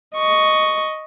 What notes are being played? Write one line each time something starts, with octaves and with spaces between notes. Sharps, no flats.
D#5 C#6